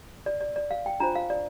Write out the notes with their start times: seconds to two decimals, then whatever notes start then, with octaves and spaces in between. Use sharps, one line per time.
0.26 D5
0.41 D5
0.56 D5
0.71 F5
0.86 G5
1.00 D4 F4 C5 A#5
1.15 F5
1.30 D5